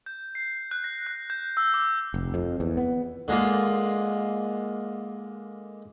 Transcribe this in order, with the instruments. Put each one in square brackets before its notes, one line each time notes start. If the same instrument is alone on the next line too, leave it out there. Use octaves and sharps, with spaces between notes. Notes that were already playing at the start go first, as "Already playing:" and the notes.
[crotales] G6
C7
F#6
A#6
F#6
G6
E6
D6
[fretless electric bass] F1
F2
E2
B3
[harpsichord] D3 G#3 A#3 F4